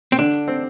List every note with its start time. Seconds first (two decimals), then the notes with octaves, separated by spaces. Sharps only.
0.12 C4
0.19 D3 D4
0.48 C4